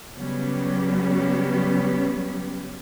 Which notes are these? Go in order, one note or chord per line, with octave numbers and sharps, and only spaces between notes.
C#3 F#3 G3 B3 C#4 G4